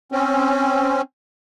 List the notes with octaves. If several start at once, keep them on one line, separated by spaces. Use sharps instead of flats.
C4 C#4